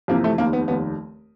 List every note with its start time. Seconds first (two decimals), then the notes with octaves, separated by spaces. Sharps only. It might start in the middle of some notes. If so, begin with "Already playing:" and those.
0.08 F2 C3 E3 A#3
0.24 A3
0.38 F1 D#2 D#3 A#3
0.53 B3
0.68 F1 D#2 D#3 B3